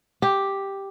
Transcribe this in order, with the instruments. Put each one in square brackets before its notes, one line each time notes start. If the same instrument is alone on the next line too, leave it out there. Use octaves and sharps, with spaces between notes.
[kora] G4